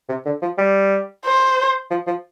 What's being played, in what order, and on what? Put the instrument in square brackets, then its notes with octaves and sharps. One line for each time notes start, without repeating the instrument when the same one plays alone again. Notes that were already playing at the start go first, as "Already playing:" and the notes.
[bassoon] C3
D3
F3
G3
[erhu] C5
[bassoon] F3
F3